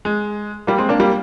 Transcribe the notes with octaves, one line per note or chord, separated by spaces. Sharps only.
G#3
G3 A#3
G#3 C4
A#3 D4
G3 A#3